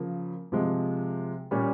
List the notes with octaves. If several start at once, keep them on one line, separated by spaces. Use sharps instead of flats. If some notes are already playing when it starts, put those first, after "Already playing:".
Already playing: C#3 F3 A#3
C3 F3 G#3
A#2 G3 C#4